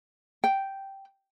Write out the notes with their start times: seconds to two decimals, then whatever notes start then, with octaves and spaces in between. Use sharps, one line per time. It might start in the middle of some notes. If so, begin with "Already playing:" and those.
0.44 G5